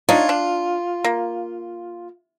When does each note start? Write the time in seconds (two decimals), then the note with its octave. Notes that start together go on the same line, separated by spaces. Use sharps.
0.09 D4 D#4 F4 C#5
0.29 D4
1.04 A#3